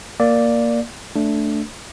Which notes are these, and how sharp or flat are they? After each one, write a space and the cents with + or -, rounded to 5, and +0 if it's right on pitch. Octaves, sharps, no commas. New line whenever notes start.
A#3 +0 D5 +0
A3 +0 D4 -10